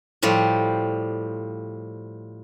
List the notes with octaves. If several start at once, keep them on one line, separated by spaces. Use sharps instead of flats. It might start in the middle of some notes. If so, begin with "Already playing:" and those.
A2 F3 G3 F4